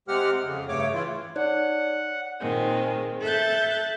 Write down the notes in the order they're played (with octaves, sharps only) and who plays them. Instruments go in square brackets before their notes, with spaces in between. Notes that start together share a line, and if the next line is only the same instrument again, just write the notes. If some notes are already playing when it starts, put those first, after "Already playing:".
[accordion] C3 G#3 C4 G4 F#5 F6
F2 C#3
G2 C#3 A3 C#5 D6
A2 E3 E4 F4
[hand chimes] D#4 C#5 D5 [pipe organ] F#5
[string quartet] A#2 D#3 G#3 C4
A4 E5 F#6 G6 A6